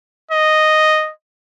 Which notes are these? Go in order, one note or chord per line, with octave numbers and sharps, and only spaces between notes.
D#5